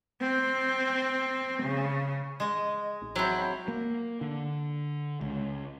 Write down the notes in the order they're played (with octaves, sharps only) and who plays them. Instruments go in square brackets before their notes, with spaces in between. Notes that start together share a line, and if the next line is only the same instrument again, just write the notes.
[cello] C4
C#3
[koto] G#3 D#5
[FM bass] A1
[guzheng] F#3 [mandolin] C4 E4
[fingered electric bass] A#3
D3
C#2